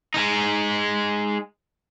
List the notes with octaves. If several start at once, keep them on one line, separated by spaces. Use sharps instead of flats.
G#3 D#4